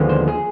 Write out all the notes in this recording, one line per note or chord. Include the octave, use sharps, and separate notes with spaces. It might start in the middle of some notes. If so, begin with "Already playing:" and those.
Already playing: D#2 D3 F3 G#3 B3
C5
G#4